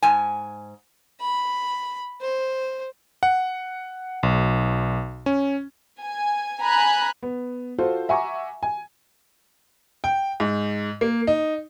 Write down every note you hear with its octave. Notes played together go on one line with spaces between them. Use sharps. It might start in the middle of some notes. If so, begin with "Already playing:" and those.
G#2 G#5
B5
C5
F#5
B1
C#4
G#5
G#5 A#5 B5 F#6
B3
F4 F#4 A4 C5
E5 F#5 G#5 A#5 C#6 D6
G#5
G5
G#2
A#3
D#4